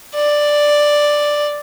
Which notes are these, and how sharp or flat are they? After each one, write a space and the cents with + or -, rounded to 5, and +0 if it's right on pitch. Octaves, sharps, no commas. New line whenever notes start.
D5 +5